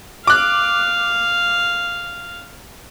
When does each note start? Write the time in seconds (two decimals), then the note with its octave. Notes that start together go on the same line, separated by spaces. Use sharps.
0.27 F5 D6 F#6